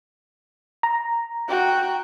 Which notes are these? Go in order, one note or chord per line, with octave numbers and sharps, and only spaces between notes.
A#5
F#4 G5